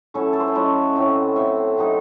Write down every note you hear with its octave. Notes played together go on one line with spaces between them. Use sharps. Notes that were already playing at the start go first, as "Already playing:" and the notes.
F#3 A3 C#4 E4 A4
A4
C5
C#5
F#3 A3 C#4 E4 D#5
A2 F#3 C4
A2 F#3 C4 E5
C3 F#3 C4 D#4